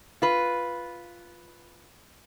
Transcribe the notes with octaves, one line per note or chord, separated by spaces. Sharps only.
F4 B4